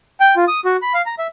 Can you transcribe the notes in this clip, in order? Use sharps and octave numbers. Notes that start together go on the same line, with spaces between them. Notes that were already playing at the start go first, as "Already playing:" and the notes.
G5
F4
D#6
F#4
B5
F5
A#5
E5